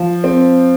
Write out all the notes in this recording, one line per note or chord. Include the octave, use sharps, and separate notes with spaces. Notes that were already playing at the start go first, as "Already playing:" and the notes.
Already playing: F3
C4